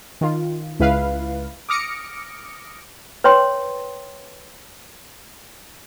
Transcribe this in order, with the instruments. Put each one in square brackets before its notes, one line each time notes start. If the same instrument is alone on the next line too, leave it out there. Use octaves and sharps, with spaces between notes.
[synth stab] D#3 F4
C#2 E4 B4 F5
D6 D#6 F6 A#6 C#7 D7
[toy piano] B4 C#5 G5 C6